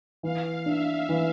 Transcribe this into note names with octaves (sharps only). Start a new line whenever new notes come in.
E3 F5
D4 E5
E3